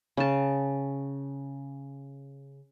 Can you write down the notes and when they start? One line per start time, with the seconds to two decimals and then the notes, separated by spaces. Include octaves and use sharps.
0.17 C#3 A5